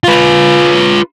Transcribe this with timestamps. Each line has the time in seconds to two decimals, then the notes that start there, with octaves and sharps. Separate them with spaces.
0.04 F4 B4